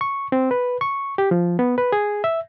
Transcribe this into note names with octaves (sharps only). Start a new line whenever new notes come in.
C#6
C4
B4
C#6
G4
F3
B3
B4
G#4
E5